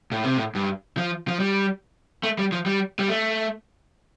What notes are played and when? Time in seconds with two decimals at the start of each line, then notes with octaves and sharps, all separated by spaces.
0.12 A2
0.24 C3
0.37 A2
0.55 G2
0.97 F3
1.28 F3
1.40 G3
2.23 A3
2.38 G3
2.52 F3
2.66 G3
2.99 G3
3.08 A3